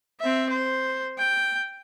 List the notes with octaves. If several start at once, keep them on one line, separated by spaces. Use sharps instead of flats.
C4 E5
C5
G5